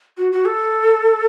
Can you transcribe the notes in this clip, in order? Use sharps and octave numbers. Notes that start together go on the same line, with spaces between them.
F#4
F#4
A4